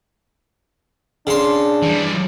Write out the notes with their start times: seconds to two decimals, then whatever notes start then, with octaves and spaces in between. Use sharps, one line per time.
1.27 C#3 D4 C6
1.82 E3 G3